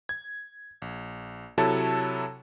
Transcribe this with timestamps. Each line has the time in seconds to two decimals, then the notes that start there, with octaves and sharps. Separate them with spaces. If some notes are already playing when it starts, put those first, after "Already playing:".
0.09 G#6
0.82 A#1
1.58 C3 F#3 E4 A4 C#5 A5